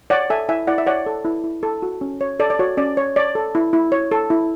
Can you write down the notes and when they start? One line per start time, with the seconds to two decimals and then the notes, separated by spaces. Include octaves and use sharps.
0.10 C#5 D5 F#5
0.30 A4 E5 G#5
0.49 E4 E5 G#5
0.67 E4 D5 F#5
0.78 E5
0.87 C#5 D5 F#5
1.06 A4
1.25 E4
1.44 E4
1.63 A4
1.82 F#4
2.01 C#4
2.21 C#5
2.40 A4 D5
2.50 D5
2.59 F#4 C#5
2.77 C#4 D5
2.97 C#5
3.16 C#5 D5
3.35 A4
3.55 E4
3.73 E4
3.92 C#5
4.11 A4
4.30 E4